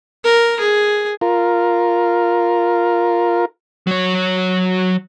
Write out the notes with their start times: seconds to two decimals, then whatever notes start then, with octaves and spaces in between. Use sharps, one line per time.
0.25 A#4
0.60 G#4
1.21 F4 A#4
3.87 F#3 C#5